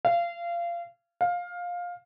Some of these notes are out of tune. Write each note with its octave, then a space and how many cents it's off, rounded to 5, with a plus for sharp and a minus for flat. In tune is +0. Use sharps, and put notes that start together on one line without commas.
F5 -25
F5 +15